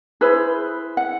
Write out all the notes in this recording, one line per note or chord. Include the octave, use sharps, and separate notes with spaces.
E4 G#4 B4 C5
F#5